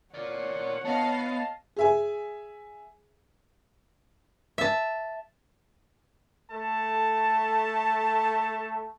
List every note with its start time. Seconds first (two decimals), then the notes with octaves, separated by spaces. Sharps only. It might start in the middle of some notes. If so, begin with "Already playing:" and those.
0.14 A#4 C#5 D5 F#5
0.85 B3 D#5 F5 A5
1.76 G#4 E5 G#5
4.58 E5 A5
6.51 A3 A4 A5